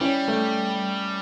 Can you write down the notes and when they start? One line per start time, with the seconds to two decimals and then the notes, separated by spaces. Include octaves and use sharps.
0.01 G3 C#4 E4
0.28 A3